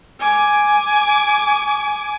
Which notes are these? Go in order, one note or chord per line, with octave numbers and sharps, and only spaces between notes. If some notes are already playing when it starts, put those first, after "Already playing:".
G#5 D6